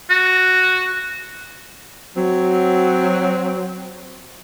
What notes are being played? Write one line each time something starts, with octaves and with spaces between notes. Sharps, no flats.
F#4
F#3 C4